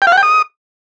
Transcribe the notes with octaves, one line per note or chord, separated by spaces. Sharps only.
G5
F5
F#5
G5
D#6